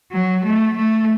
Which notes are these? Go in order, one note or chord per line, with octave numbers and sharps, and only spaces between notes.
F#3
A3
A3